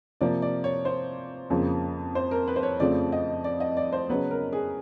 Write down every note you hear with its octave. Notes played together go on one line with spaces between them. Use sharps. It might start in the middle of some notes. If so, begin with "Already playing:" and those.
C3 F3 A#3 D5
D5
C#5
C5
F2 C#3 F3 A#3
C5
A#4
B4
C5
C#5
F2 C#3 F3 A3 C4 D5
D#5
D5
D#5
D5
C5
C#3 F#3 B3 B4
A#4
G#4